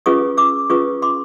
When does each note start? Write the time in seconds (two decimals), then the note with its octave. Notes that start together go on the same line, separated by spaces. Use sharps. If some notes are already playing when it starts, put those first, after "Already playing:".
0.06 C#4 F4 G#4 B4 C#6 D#6
0.37 D6 E6
0.70 C#4 F4 G#4 B4 C#6 D#6
1.02 C6 D6